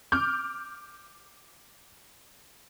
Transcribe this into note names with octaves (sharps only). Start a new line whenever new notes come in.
D6 F6 G6